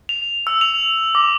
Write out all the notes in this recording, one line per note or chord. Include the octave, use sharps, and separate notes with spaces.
F7
E6
F7
D6